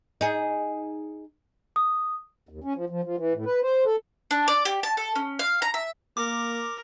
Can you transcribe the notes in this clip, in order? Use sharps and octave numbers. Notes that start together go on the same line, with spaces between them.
D#4 G#4
D#6
D#2
C#4
F3
F3
F3
E3
A2
B4
C5
A4
D4
D5
G4
A5
A4
C#4
F5
A#5
E5
A#3 A#4 D6